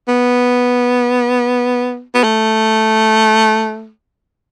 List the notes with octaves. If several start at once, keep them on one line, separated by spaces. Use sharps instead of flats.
B3
B3
A3